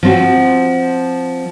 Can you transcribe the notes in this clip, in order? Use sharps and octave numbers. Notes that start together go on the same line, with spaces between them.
F3 C4 F#4